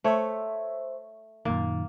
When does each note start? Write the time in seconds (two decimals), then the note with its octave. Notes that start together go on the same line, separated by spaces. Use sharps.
0.04 A3 C5 C#5 E5
1.45 F#2 A#2 D#3 A#3